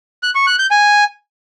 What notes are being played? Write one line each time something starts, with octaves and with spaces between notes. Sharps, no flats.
F#6
C#6
F#6
G6
G#5